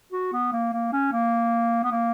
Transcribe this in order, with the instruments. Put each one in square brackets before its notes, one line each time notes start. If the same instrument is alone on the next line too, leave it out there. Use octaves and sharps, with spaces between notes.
[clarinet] F#4
B3
A#3
A#3
C#4
A#3
B3
A#3